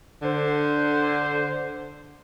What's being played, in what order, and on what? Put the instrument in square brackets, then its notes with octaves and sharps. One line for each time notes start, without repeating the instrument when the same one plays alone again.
[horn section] D3 C5